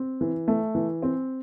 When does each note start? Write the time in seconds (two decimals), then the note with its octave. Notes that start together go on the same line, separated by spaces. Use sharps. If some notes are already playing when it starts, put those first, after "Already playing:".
Already playing: C4
0.21 E3
0.48 A3
0.75 E3
1.03 C4